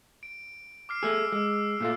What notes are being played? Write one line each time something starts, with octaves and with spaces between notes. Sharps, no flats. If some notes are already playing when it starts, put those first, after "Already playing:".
D7
D6 F6 C7
A3 G#4 E6
G#3
A#2 A3 F4